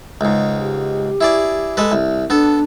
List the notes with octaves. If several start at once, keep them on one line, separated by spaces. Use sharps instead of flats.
C#2 G#2
G4
E4 G#4 D5
G#3 A4 B4
C2
B3 D4 A4